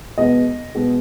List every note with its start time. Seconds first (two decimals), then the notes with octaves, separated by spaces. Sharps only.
0.18 B2 G#3 B3 D#5
0.75 B2 G#3 B3